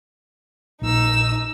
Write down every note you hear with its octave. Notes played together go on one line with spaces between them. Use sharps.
A#1 D#4 E6